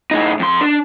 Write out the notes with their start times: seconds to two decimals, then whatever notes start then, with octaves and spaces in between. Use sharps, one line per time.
0.11 A2 D#4
0.39 F2 C6
0.61 D4